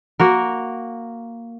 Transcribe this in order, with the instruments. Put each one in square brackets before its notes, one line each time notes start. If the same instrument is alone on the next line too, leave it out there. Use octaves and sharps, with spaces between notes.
[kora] A#3 F#4 A#4